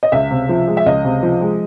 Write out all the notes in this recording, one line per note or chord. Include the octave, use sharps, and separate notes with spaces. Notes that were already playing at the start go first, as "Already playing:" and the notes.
D#5
C#2 E5
C3
F3
G#3
E5
C#2 D#5
C3
F3
G#3